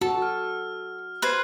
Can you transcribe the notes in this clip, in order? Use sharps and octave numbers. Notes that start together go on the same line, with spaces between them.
F#4 A4
F6
B4 C5 F#6 G#6 C7